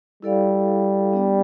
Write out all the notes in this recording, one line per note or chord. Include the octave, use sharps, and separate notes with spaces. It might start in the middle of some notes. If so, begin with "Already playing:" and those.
G3 E4 A4 D5 F5
B3 D4 G4 D5